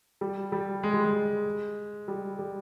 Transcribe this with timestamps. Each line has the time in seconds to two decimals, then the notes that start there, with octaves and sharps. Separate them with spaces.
0.21 G3
0.52 G3
0.83 G#3
0.93 G3
1.04 G#3
2.08 G3
2.39 G3